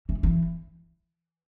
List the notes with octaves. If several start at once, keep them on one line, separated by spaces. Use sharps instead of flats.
E3
E3